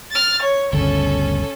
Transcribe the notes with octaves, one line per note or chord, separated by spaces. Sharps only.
F6 A6
C#5
G1 D2 C#3 C#4 A4